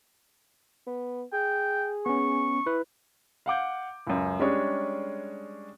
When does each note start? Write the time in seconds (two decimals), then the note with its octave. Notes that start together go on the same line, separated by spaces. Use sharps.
0.87 B3
1.33 G#4 G5
2.06 B3 C#4 C#6
2.66 E4 B4
3.46 F5 F#5 D6 G6
4.07 C#2 F#2
4.39 G3 G#3 C#4 D4 G#4 C#5